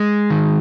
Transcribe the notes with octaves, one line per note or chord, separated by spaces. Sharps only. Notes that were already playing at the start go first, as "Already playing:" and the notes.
Already playing: G#3
D#3